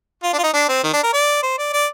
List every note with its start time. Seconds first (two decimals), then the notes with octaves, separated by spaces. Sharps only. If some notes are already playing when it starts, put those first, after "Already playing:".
0.23 F4
0.33 D4
0.39 F4
0.43 D#4
0.53 D4
0.69 C4
0.84 D#3
0.93 D4
1.03 A#4
1.13 D5
1.43 C5
1.58 D5
1.73 D5